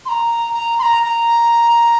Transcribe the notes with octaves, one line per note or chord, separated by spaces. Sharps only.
C6
A#5
A#5
C6
A#5
A#5